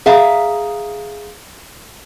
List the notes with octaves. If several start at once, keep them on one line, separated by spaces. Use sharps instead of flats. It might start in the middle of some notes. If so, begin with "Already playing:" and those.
G#4 E5 F5 A#5